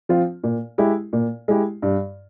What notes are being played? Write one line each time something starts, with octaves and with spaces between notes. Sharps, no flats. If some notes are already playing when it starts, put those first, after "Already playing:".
F3 C4 F4
A#2
G#3 E4 G4
A#2
G#3 E4 G4
G2